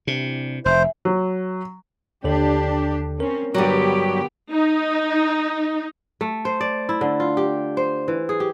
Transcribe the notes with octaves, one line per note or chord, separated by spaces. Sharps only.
C3 E3 G3 D4
F1 E4 G#4 C5 E5
F#3
D#2 D3 D4 G4 A4
C4 C#4 A#4
G2 D3 F#3 B3 G4
D#4
A3
C5
D5
E4
D3
F4
G4
C5
E3
G#4
G4